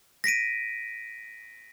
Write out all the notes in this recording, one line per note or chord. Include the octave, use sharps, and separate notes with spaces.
A#6 B6 D7 D#7